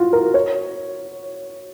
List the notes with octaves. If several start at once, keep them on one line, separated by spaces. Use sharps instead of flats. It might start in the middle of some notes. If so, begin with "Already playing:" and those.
Already playing: F4 F#4
A#4
C#5